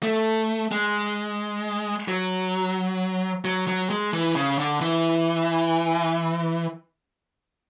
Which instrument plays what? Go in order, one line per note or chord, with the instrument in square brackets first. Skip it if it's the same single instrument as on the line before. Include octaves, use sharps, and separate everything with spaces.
[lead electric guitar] A3
G#3
F#3
F#3
F#3
G#3
E3
C#3
D3
E3